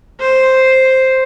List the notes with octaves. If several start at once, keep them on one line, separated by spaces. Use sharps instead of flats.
C5